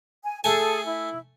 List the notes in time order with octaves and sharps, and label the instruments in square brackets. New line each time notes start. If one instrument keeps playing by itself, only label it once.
[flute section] G#5
[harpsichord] A3 G#5 [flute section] G#4 A4
[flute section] E4